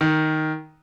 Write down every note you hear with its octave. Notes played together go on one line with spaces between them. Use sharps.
D#3